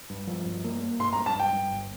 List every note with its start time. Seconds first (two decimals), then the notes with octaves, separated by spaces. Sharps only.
0.10 G2
0.27 F3
0.45 G2
0.64 A#3
0.82 A#3
0.99 G2 C6
1.13 A#5
1.17 G2
1.26 A5
1.35 G2 G5
1.53 G2
1.71 G1